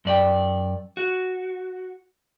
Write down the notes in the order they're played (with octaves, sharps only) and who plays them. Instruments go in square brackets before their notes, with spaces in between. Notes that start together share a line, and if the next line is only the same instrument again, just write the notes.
[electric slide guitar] F#2 D5 G5
F#4